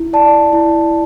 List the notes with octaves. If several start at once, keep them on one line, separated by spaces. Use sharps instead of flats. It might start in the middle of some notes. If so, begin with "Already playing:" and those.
Already playing: E4
D5 A5
E4